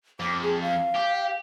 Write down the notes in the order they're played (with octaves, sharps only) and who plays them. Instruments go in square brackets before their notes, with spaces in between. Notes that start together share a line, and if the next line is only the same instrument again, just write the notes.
[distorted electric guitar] F2 [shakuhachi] D6
[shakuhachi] G#4
F5
[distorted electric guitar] G4